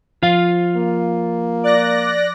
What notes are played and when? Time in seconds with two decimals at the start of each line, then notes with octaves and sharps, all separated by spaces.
0.23 F3 F4 F5
0.76 A#3
1.64 D5 F#6 A#6